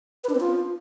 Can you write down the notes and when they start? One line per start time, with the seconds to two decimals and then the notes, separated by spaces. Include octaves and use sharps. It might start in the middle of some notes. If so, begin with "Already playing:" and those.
0.24 B4
0.29 D4
0.35 C4
0.40 F4